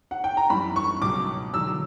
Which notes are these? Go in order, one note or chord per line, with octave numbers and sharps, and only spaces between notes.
F#5
G5
A#5
F#2 E3 G3 B5
C#6
C#2 B2 F#3 D6
E2 D3 F#3 E6